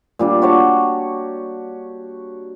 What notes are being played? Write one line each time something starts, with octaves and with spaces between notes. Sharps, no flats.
A#2 G3 D4
F#4 G4 C#5 A5